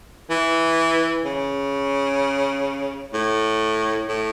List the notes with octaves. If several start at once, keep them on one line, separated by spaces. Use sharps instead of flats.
E3
C#3
A2
A2